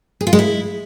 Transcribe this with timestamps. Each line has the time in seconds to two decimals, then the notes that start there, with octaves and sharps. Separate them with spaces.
0.21 G#4
0.27 F4
0.33 G#3
0.39 E4